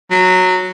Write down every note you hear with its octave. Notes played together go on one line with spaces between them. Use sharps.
F#3